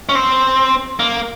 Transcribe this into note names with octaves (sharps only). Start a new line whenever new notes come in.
C#4
C4
A#3